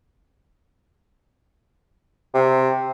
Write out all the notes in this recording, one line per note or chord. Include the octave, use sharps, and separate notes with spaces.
C3